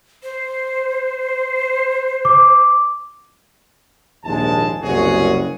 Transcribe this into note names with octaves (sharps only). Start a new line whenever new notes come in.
C5
D6
A#1 D#2 G#2 G#3 A5
F#1 C2 B2 C#4 F#4 G#4